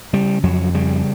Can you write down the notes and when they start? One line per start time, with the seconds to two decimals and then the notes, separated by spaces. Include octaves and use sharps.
0.13 C#3 G3
0.43 F2 F#3
0.74 C#3 G3